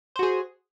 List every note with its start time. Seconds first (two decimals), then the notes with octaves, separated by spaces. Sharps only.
0.16 C5
0.19 F#4
0.23 G#4